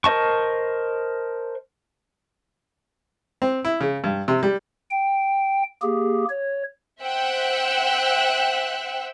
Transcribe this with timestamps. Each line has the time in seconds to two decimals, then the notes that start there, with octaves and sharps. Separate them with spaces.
0.04 A#4 C5 D#5 A5 C#6
3.42 C4
3.65 E4
3.81 C#3
4.04 G2
4.28 C3
4.43 G3
4.90 G5
5.82 A#3 G4 G#4
6.29 C#5
7.02 C5 E5 F#5 G5 E6 F#6